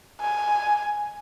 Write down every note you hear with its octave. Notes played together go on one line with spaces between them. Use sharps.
G#5